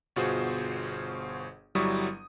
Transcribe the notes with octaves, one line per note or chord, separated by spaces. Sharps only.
G1 B2 F4 F#4 G#4 C5
G1 F#3 G3 E4 C#6 D#6